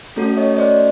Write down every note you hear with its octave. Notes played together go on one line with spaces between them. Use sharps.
A3 C#4 F#4 A4
C#5 D#5
D#5
C5 D5